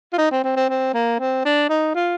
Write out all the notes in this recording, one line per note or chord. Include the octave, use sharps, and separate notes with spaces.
F4
D#4
C4
C4
C4
C4
A#3
C4
D4
D#4
F4